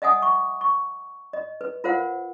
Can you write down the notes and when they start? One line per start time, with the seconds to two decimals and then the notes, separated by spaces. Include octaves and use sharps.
0.02 D#5 E5 F#5 G#5 D#6
0.22 C#6
0.61 C#6
1.33 D#5
1.61 B4
1.84 F4 A#4 C5 F5 F#5